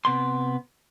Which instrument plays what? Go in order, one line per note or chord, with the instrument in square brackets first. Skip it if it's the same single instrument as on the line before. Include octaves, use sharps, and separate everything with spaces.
[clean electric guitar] C3 B3 C6